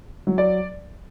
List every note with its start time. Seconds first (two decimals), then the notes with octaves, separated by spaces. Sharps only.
0.27 F#3
0.38 D5